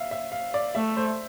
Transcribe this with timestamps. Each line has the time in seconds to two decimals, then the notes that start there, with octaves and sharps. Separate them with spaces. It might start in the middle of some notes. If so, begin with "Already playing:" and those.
Already playing: E5 F5
0.11 E5
0.32 F5
0.54 D5
0.75 A3 E5
0.97 C5